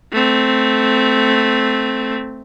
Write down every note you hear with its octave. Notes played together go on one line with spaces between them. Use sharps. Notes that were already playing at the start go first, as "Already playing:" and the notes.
A3 C4